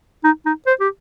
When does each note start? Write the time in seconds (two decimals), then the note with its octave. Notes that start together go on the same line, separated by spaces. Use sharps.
0.24 D#4
0.46 D#4
0.67 C5
0.80 G4